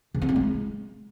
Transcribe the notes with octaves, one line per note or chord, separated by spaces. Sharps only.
C#3
C4
E4
G#3